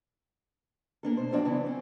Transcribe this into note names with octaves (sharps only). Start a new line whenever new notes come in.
A#3 D4 A4
B2 C5
F2 F3 F#3 D4 D5
C#3 E3 B3
C4 C#4